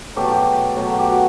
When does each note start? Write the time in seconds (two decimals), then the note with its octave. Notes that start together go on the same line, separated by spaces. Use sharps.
0.16 B2 F#3 A3 G4
0.31 G4
0.77 B2 F#3 A3
0.99 G4
1.07 F#4